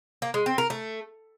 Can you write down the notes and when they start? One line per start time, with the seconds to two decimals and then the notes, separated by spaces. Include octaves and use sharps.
0.22 A#3
0.34 G#3
0.46 C4
0.58 A#4
0.70 A3